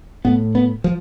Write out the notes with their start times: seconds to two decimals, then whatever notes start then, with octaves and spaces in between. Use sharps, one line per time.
0.25 A2 B3
0.55 B3
0.84 F3